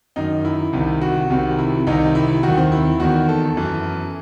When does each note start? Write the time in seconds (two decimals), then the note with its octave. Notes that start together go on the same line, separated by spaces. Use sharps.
0.16 F#2 D#3 D#4
0.45 E4
0.73 C2 C3 D#3
1.02 F#4
1.30 C2 C3 D#3
1.58 E4
1.87 C2 C3 D#3 D#4
2.15 E4
2.43 D#2 D#3 F#4
2.58 C4
2.72 E4
3.00 E2 D#3 F#4
3.29 A4
3.57 F#2 E3